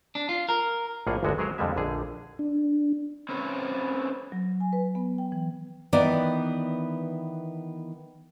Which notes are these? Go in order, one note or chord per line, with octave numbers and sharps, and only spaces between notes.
D4
F4
A#4
A#1 A2 A#3 F4 G#4 F#5
G1 D2 D3 G#3 F#4
F#3 G#3 G#4 A#4 C5 C#5
F2 D3 G3 G#3 E5
A#1 D3 G#4
D4
C4 C#4 B4 C#5
F#3
G#5
B4
B3
G5
E3
D#3 E3 B3 B4 D5